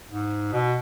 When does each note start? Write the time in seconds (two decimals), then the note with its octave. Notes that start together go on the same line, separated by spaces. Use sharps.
0.10 G#2
0.52 B2